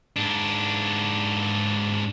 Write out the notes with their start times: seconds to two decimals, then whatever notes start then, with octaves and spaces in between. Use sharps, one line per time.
0.16 G#2 D4